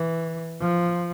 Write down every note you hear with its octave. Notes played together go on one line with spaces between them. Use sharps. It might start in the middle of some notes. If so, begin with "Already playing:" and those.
Already playing: E3
F3